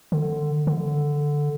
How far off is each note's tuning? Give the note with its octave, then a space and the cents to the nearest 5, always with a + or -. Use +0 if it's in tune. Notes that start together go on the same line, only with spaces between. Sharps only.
D3 +20
D3 +0